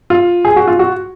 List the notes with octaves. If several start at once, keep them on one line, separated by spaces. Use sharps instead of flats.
F4
G#4
F#4
F4
F#4